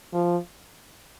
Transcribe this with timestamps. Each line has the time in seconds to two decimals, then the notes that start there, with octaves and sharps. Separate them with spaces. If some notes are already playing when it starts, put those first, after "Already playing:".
0.13 F3